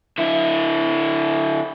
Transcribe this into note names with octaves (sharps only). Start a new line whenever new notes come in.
D3 E4